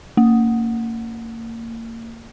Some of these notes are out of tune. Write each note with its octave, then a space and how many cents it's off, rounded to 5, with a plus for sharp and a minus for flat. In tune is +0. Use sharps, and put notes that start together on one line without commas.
A#3 -30